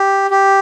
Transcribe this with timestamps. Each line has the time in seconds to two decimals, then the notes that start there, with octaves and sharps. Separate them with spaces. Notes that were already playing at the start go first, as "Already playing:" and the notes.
Already playing: G4
0.31 G4